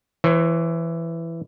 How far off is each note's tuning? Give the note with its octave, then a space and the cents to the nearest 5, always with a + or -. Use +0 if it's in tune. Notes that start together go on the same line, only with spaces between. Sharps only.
E3 +10 C#5 -45